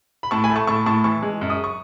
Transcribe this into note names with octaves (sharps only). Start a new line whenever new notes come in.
B5
A2 A5 C#6
G#5 B5
A3
A5 C#6
A2 A5 C#6
A2 A5 C#6
E3 A5 C#6
G#3
F#2
D#6
C#6